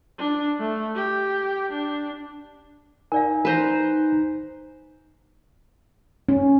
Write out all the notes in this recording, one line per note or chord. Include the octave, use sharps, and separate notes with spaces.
D4
A3
G4
D4
D#4 A#4 D5 F5 G#5
B4 C5 A#5
C#4